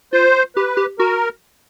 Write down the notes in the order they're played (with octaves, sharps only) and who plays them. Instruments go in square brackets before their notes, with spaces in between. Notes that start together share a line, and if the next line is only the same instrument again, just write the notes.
[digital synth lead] F4 [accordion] C5
[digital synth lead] G4 [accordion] B4
[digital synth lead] G4
[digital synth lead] F#4 [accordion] A#4